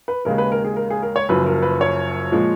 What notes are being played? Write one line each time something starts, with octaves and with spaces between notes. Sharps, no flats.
B4
D#2 C#3 G#3 A#4
B4
A#4
G#4
A#4
G#4
A#4
C#5
F#1 F#2 F3 B4
A#4
B4
C#5
A#2 F3 G#3